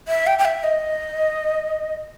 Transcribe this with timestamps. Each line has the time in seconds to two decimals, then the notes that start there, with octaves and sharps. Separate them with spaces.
0.08 E5
0.27 G5
0.39 G5
0.45 E5
0.64 D#5